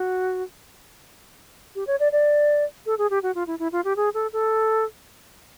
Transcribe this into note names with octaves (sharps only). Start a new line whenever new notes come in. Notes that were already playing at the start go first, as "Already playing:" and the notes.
Already playing: F#4
G4
C#5
D5
D5
A4
G#4
G4
F#4
F4
E4
E4
F4
G4
G#4
A4
A4